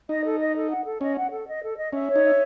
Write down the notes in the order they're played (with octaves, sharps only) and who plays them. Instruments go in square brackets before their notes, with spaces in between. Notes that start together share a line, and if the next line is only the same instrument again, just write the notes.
[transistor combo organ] D#4 [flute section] D#5
[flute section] A4
D#5
A4
F#5
A4
[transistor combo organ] C#4 [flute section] D#5
[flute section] F#5
A4
D#5
A4
D#5
[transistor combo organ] C#4 [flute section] E5
[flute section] C#5
[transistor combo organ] D#4
[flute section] E5